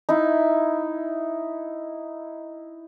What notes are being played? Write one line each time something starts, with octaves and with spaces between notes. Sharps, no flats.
D#4 E4